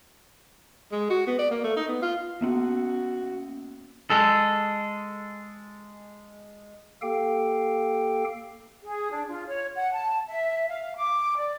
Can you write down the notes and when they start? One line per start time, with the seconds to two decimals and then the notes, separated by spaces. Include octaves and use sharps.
0.92 G#3
1.10 F#4
1.27 B3
1.39 D5
1.51 A#3
1.64 A3
1.76 D#4
1.88 B3
2.02 F4
2.41 A#3 B3 C#4 F#4
4.10 G#3 A4
7.02 A#3 G4 A4 F5 G5
8.84 G#4
9.11 D4
9.28 F4
9.47 C#5
9.74 F#5
9.92 A5
10.27 E5
10.67 F5
10.96 D6
11.38 D5